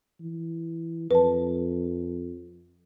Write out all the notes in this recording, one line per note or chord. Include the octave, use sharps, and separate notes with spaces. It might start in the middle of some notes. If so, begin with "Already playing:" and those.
E3
F2 B4 A5